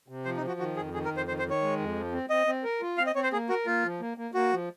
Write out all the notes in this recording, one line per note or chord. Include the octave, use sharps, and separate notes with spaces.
C3
F3 C5
D#4
F3
F#4
D#3 F#4
F2 G#4
D#3 G#4
A#4
F2
C5
D#3 C5
C5
D#3
C#5
G#3
F2
F3
C4
C4 D#5
C4
A#4
F4
C4 F5
D#5
C4 C#5
C5
A#3 G#4
F#4 A#4
A#3 F4
F3
A#3
A#3
A#3 F#4
F3